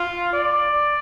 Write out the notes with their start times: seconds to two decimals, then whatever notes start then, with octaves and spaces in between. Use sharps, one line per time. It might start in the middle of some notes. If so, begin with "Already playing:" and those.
Already playing: F4
0.33 D5